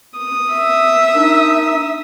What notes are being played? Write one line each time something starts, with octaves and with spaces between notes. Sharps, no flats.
D#6
E5
A#3 D4 D#4